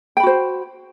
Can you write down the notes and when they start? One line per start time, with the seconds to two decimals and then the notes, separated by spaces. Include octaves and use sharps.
0.17 G5
0.20 B5
0.23 F#4
0.27 C5